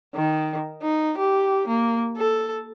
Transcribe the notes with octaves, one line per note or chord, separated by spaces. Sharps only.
D#3
D#4
G4
A#3
A4